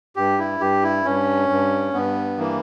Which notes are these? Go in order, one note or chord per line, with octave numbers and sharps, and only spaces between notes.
G2 G4
E4
G2 G4
E4
G2 C#4
G2
G2 B3
E3 A#3